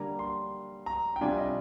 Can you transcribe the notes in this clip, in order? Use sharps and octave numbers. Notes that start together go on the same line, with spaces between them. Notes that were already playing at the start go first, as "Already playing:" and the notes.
Already playing: D3 G3 A#3 D4 A#5
C6
A#5
G5
C3 G3 D4 F4 G#5
D#5